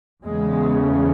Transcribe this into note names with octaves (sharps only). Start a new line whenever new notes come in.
E2 C#3 G#3
A3